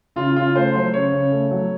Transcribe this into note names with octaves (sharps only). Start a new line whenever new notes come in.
C#3 F4
C#3 F4
A3 C5
F#3 C5
C#3 C#5
C#3
A3
F#3